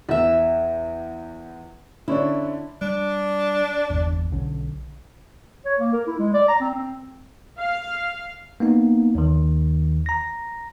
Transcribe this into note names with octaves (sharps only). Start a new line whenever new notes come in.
E2 E4 E5
D3 C#4 D4 E4
G3 D4
G1 E2
B1 D3 C#4
C#5
A#3
A#4
E4
G#3
D5
A#5
C4
C4
F5
A#3 B3 D#4
D#2 D#3
A#5 A#6